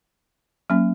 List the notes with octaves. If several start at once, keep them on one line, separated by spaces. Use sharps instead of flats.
F#3 A#3 C#4